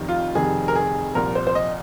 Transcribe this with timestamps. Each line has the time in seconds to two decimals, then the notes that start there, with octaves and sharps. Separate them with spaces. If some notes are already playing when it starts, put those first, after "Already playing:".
Already playing: F1 F2 C3 D#3
0.09 F4
0.35 F1 F2 C3 D#3 G#4
0.68 A#4
0.75 G#4
1.15 C2 A#2 F3 A#4
1.35 C5
1.47 C5
1.55 D#5